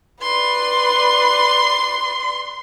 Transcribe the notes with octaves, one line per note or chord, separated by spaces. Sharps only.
B4 D5 C6